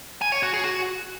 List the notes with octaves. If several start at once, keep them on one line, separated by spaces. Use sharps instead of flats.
G#5
C#5
F#4
G#4
F#4